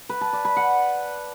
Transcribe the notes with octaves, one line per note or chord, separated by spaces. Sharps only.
B4
A5
D5
B5
F#5